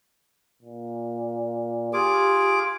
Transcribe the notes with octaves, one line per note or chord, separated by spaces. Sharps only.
A#2
F4 G4 G#4 D6